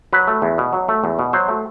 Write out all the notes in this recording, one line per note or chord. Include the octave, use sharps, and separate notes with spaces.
F#3 B4
A3
E2
B2
F#3
A3
E2
B2
F#3 C5
A3